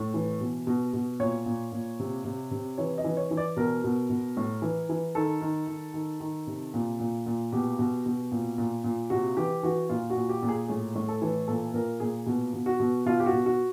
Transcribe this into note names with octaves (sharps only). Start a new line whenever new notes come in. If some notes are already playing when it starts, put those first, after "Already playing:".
Already playing: A2
E3
B2
B2
B2
A#2 C#5
A#2
A#2
C3
C3
C3
E3 C#5
D#5
E3
C#5
E3
D5
B2 A#4
B2
B2
A2
E3
E3
D#3 A4
D#3
D#3
D#3
D#3
C3
A#2
A#2
A#2
B2 G4
B2
B2
A#2
A#2
A#2
C3 F#4
E3 G4
E3 F#4
A#2 F4
F#4
A#2
G4
A#2
G#4
A2 G#4
A2
A4
E3
A#2 A4
A#2 A#4
A#2 G#4
B2
B2
F#4
B2
B2 F4
G4
F#4
B2
F#4